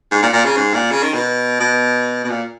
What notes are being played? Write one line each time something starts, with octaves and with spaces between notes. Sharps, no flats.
G#2
A#2
A#2
C#3
G#2
A#2
C#3
D#3
B2
B2
B2
A#2